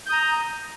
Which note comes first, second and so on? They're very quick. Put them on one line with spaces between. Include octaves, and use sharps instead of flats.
G6 D#6 A#5